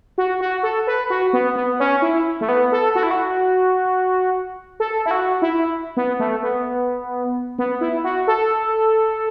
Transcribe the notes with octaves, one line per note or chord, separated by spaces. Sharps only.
F#4
F#4
A4
B4
F#4
B3
B3
C#4
E4
A3
B3
A4
F#4
E4
F#4
A4
E4
F#4
E4
B3
A3
B3
B3
E4
F#4
A4